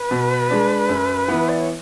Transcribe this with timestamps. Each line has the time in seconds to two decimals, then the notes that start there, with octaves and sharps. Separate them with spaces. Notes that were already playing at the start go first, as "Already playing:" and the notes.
Already playing: B4
0.11 B2
0.51 G#3 D4
0.89 F#2
1.28 E3 B3 E4
1.49 D5
1.58 C#5